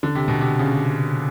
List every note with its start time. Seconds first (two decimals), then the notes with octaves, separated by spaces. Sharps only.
0.03 D3
0.15 C3
0.28 B2
0.41 C3
0.59 C#3